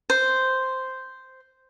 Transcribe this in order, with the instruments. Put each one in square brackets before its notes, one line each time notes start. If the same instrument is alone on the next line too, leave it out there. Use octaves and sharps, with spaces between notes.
[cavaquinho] C5